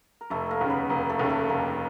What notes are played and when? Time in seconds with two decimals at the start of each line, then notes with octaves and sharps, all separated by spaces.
0.21 A#4
0.30 F1 A3 A4
0.51 A#3 A#4
0.61 D#2 C#3
0.70 B3 B4
0.90 F1 A#3 A#4
1.09 A3 A4
1.19 D#2 C#3
1.29 A3 A4
1.49 F1 A#3 A#4